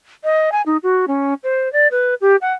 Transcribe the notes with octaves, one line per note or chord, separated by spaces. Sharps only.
D#5
G#5
D#4
F#4
C#4
C5
D5
B4
G4
F#5